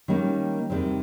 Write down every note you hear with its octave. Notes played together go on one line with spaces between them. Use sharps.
D#3 G3 A#3 C#4
E2 C3 D#3 G3 C4